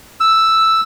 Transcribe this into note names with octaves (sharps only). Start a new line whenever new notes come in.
E6